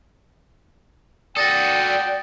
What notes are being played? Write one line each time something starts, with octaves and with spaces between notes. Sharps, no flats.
F#4 A4 D5 G5 D#6 A6 A#6